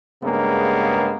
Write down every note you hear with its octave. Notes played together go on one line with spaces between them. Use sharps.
G2 C#3 G#3 A#3 B3